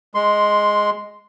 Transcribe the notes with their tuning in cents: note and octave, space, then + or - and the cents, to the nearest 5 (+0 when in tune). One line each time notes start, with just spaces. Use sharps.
G#3 +0 C6 +0